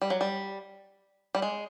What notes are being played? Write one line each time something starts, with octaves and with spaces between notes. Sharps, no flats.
G3
F#3
G3
G3
G#3